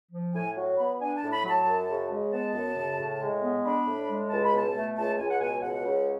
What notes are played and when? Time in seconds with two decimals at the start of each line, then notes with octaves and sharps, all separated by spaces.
0.12 F3
0.34 A2 G#5
0.56 F#3
0.78 B3 B5
1.00 D4 G#5
1.16 A5
1.22 A2
1.32 B5
1.44 F#3 A5
1.66 F#2
1.89 C#3
2.10 G#3
2.32 B3 A5
2.54 F#2
2.76 C#3
2.98 A2
3.21 G#3
3.42 B3
3.64 D4 B5
3.87 A2
4.09 G#3
4.30 C#2 A5
4.43 B5
4.53 B2 A5
4.75 A3
4.96 C#2 A5
5.18 C#2 G#5
5.30 F#5
5.40 B2 G#5
5.63 C#2 F#5
5.85 C#3